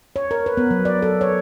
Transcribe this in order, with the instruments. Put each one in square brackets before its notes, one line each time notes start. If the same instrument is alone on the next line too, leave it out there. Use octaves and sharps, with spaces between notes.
[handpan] C#5
A#4
B4
B3
F#3
D5
A4
C#5